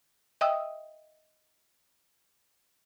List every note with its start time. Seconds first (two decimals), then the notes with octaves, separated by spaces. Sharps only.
0.41 D#5 E5 G5 D#6 E6